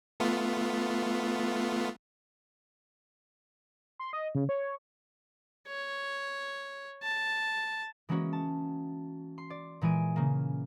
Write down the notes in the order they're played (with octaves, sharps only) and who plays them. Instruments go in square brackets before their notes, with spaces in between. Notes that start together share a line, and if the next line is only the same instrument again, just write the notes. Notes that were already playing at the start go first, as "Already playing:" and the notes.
[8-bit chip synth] A3 B3 F4
[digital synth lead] C6
D#5
C#3
C#5
[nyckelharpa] C#5
A5
[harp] E3 G#3 A#3 C#4 F#4 C#5
A5
C6
D5
A#2 E3 G#3 G#5 D7
C#3 A#3